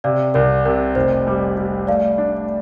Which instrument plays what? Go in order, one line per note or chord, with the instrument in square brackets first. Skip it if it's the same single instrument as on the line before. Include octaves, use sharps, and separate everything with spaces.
[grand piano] C3 [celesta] D5 F5
[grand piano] C2 [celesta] A#4 D5
[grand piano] C3 [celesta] A#4
[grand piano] F1 [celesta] C5
[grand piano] G3
G3
[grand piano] A3 [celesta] D5 F5
[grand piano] D4